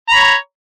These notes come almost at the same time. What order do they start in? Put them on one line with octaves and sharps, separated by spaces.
A#5 B5 C#5